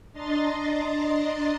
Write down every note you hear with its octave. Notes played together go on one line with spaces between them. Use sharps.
D4 D#5 A#5 C6 A6